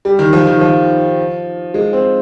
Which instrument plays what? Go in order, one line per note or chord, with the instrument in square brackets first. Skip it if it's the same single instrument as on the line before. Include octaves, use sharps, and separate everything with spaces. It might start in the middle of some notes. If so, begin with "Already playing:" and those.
[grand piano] G3
D#3
F3
D#3
F3
G#3
C4